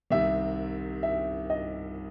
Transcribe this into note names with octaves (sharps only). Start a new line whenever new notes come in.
C2 C3 D#3 E5
E5
D#5